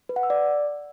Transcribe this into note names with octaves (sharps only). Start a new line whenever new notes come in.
B4
F#5
E6
D5